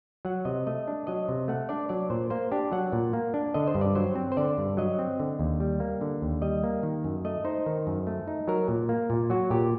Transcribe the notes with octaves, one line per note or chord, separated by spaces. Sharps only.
F#3 F#5
C3 D#5
A3 D#5
D4
F#3 D#5
C3
A3 F#5
D4 D5
F#3 D5
A#2 C5
A#3 C5
D4 G4
F#3 F#5
A#2
A#3
D4
D3 D#5
C5
G2
D5
F#3 C5
C4
C5
D3 D5
G2
F#3 D#5
C4
D3
D#2
G3
A#3
D3
D#2
G3 D#5
A#3
D#3
F#2
A3 D#5
D#4 C5
D#3
F#2
A3
D#4
F#3 A#4
A#2
A#3
A#2
F#3 F#4
A#2 G4